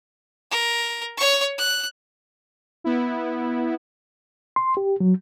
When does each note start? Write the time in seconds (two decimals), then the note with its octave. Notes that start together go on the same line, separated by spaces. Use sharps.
0.51 A#4
1.17 C#5 C#6
1.58 F#6
2.84 B3 E4
4.56 C6
4.77 G4
5.00 F#3